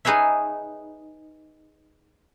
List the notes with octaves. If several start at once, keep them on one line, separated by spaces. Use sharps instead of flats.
D#4 G#4 B4 C#5 E5